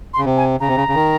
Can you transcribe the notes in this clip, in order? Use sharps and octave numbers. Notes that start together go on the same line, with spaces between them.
C6
C#3
C3
G#5
C#3 A#5
C3
C#3
C#3
D#3